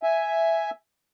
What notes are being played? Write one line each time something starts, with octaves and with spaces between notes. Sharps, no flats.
E5 G#5